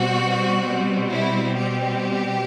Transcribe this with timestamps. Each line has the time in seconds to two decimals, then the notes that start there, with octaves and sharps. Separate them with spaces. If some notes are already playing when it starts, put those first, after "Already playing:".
Already playing: B2 G3 C4 F#4
1.12 E4
1.58 G4